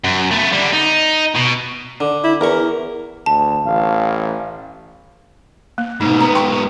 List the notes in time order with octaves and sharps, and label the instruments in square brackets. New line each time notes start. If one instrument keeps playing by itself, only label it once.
[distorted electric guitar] F#2
A3 B3
D3 G3
D#4
B2
[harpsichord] D3
[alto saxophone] E4
[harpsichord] E2 C#6 [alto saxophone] A#4
[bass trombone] D2 [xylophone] A5
[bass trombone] A1 [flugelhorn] F5
[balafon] A#3
[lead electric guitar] G#2 B2 [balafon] D#4
[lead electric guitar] G#2 B3 [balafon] A#5
[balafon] G5 C6 C#6